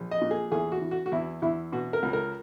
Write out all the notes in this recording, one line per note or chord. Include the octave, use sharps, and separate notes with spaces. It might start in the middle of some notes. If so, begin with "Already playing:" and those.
Already playing: A#1
D#5
A#2
G#4
E2 G#4
F#4
E3
F#4
F#4
E2 E4
E2 E4
B2 F#4
A#4
C#2
A#4